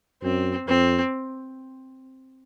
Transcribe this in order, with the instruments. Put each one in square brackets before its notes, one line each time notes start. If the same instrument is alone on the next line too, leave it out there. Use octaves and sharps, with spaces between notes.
[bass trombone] F#2 [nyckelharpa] C4
[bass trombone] F2 [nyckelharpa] C4